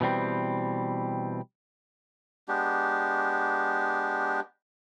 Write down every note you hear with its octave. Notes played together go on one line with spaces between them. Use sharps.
B2 E3 G3 C4
G#3 B3 D4 G4